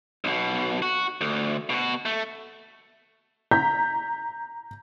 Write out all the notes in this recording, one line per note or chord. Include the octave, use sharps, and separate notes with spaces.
B1 B2
F#4
D2
B2 F#4
A3
A#5 G6 B6